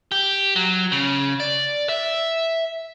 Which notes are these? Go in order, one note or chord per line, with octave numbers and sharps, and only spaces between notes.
G4
F#3
C#3
D5
E5